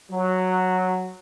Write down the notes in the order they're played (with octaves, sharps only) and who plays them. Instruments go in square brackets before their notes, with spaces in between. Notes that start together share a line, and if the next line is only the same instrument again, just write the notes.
[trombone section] F#3